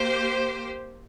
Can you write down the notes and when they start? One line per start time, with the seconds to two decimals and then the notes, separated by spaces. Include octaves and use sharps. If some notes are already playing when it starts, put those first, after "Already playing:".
Already playing: A#3 G4 C5